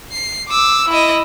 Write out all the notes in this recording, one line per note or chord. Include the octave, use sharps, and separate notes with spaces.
C7
D6 E6
E4 D#5